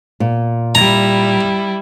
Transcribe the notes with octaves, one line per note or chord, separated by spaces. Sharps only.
A#2
G3 E4 A#5